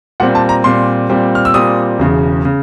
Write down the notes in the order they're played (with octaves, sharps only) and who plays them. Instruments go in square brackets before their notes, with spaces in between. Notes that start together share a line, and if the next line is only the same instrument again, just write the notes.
[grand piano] A#2 G3 C4 F#5
A5
A#5
A#2 G3 C4 C6
A#2 G3 C4
F6
E6
A#2 G3 C4 D#6
E1 E2 C#3
C#3